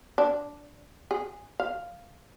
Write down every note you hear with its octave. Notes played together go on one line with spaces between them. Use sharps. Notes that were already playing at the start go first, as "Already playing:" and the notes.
D4
G#4
F5